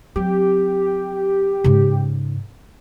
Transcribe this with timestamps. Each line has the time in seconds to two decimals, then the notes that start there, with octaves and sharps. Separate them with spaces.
0.16 F#3 C4 G4
1.64 G#2 C#3